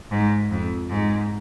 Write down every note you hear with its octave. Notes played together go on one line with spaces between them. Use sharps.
G#2
F2
G#2